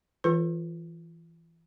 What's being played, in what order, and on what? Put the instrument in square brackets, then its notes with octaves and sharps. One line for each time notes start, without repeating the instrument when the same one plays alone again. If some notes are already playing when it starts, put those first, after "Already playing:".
[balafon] E3 F4 A4 B4